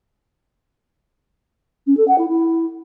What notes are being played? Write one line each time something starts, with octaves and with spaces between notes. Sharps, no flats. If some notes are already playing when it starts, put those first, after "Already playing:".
C#4
A4
F#5
E4
E4